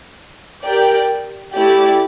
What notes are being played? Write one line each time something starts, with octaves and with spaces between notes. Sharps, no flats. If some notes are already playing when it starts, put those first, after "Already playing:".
G4 A#4 D5 G5
A3 E4 G4 D5